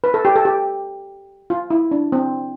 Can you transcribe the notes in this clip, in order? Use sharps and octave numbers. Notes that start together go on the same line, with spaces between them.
B4
A4
G4
A4
G4
F4
E4
D4
C4